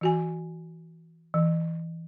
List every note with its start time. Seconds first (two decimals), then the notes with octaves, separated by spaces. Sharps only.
0.01 E3 F#4 G#5
1.34 E3